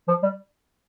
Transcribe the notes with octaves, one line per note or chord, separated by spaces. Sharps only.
F3
G3